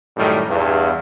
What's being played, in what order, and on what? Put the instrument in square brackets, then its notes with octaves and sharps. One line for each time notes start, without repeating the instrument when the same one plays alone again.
[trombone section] F#2 A2 D#3 G3
E2 G2